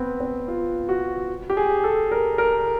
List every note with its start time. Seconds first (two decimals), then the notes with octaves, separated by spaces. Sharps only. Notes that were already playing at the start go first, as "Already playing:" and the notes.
Already playing: B3 C4
0.20 C4
0.48 F4
0.89 F#4
1.50 G4
1.57 G#4
1.84 A4
2.11 A#4
2.38 A#4